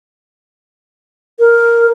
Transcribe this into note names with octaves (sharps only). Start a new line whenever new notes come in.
A#4